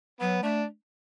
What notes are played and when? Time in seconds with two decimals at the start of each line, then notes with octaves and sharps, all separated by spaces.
0.21 F#3 B3
0.43 A3 D4